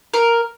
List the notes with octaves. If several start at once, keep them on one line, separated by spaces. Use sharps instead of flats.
A#4